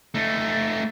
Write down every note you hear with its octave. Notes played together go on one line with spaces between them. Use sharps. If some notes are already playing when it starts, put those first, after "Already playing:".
A3 D#4